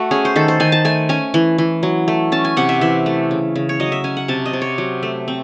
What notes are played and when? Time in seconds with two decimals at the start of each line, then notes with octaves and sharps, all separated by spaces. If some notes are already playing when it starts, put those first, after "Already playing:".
Already playing: A3 F#4
0.11 C#4 G#4
0.25 C5
0.36 D#3 A4
0.48 C5
0.60 D#3 G#5
0.72 A5
0.85 A3 G#5
1.09 C#4 G#5
1.34 E3
1.58 E3
1.83 F#3
2.08 A3
2.32 C#4 A5
2.45 G#5
2.57 C3 F#5
2.69 E5
2.81 E3 E5
3.06 A3
3.31 C#3
3.56 C#3
3.69 C#5
3.80 F#3 D#5
3.92 E5
4.04 C#4 G#5
4.17 F#5
4.28 C3 A5
4.46 D#5
4.53 C3
4.61 C#5
4.78 F#3
5.03 A3
5.28 C4